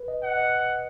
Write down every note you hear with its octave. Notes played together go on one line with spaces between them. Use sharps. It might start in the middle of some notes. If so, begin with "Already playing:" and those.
Already playing: B4
D#5
D#5 F#5
D#5